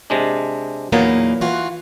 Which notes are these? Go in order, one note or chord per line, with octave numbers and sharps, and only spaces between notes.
C3 G#3 D4
E2 A#2 F#3 A#3 B3 D#4
E3 F4 F#4